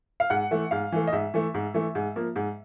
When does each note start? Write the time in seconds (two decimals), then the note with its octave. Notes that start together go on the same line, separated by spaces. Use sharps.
0.20 F5
0.30 G#2 F#5
0.51 E3 A3
0.71 G#2 F5
0.92 E3 A3
1.07 D#5
1.12 G#2 E5
1.34 E3 A3
1.54 G#2
1.74 E3 A3
1.95 G#2
2.16 F3 A#3
2.36 G#2